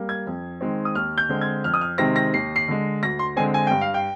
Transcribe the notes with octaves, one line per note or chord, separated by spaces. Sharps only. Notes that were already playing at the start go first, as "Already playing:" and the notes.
Already playing: G3 A#3
G#6
F2
D#3 G#3 C4
D#6
D#2 F6
G6
D3 G#3 C4
G#6
F2 F6
D#6
F6
C3 D#3 G#3 C4 A#6
A#6
D#2 C7
C7
D3 G#3
D2 A#6
C6
D3 G#3 C4 G#5
G#5
G2 G5
F5
G5